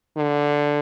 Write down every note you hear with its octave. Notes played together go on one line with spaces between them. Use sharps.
D3